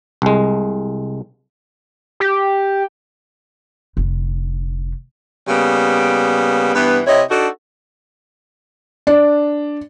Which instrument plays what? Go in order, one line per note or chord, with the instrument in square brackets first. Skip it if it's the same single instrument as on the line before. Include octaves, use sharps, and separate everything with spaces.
[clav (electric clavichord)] C2 G#3
[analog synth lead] G4
[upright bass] F1 D3
[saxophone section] C#3 G3 A#3 B3
G2 E3 B3
C3 E4 C#5 D#5
D4 D#4 F#4 A4
[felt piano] D4